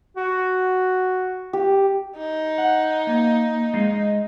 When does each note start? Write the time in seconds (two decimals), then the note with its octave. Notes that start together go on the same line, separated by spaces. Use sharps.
0.17 F#4
1.53 G4
2.18 D#4
2.58 F#5
3.07 A#3
3.74 G#3 D#5 F5